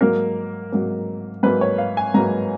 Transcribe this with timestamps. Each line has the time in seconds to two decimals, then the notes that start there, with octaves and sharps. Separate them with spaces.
0.01 G#2 F#3 A#3 A#4
0.72 G#2 F#3 A#3
1.43 G#2 F#3 A#3 B4
1.61 C#5
1.78 F5
1.97 G#5
2.14 G#2 F#3 A#3 A#5